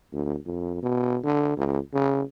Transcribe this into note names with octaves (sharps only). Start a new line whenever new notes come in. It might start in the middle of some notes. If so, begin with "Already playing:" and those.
D2
F2
B2
D3
C#2
C#3